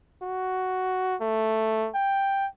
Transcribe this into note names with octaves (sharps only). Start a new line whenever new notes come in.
F#4
A3
G5